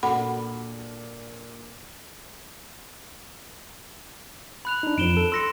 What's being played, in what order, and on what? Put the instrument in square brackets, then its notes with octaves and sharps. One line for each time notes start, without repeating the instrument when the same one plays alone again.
[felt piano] A#2 D4 [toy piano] F#4 A4 F#5 [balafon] B5
[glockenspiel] B5 F#6 F7
[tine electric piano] D4 D#4
[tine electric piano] F2 F3 [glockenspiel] D7 E7 G7
[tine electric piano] A4
[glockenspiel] C6 A#6 C#7 [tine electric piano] E6